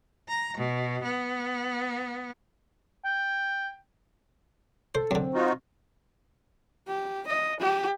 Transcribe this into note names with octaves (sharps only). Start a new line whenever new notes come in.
A#5
B2
B3
G5
A4 C5
F#2 D3 C4
D#4 F4 F#4
G4
D#5
G4